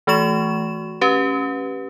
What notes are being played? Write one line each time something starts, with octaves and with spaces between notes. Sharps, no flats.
E3 A3 F#4 C#6 E7
C#4 G4 B4